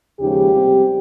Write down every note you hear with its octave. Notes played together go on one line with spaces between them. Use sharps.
D#2 C#3 F3 G#3 D#4 G4
C3 G3 C4